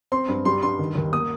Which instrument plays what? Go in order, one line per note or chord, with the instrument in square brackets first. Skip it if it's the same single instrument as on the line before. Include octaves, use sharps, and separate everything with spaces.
[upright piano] C4 [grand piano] C6
[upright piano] G2
[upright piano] G3 [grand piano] C6
[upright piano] G2 [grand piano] C6
[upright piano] D#3
D#2
[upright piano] A#3 [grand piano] D#6